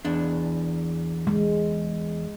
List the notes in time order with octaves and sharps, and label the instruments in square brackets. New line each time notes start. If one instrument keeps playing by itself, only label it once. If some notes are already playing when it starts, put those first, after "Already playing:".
[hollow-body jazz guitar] E2 D4
[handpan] G#3